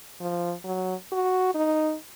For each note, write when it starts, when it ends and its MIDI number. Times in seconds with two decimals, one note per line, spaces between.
0.21 0.54 53
0.65 0.94 54
1.12 1.54 66
1.55 1.95 63